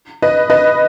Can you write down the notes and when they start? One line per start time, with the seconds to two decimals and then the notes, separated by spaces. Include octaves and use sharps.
0.22 B4 D#5
0.50 B4 D#5